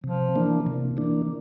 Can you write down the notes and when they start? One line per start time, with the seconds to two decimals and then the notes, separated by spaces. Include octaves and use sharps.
0.04 C3 F3
0.35 E3 A#3 D4
0.67 C3
0.97 E3 A#3 D4